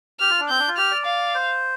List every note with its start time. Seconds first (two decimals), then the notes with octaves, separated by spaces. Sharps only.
0.20 G4 F6
0.30 F4
0.40 D4
0.49 C4 G6
0.59 D4
0.68 F4
0.77 G4 F6
0.91 D5
1.06 F5
1.35 C5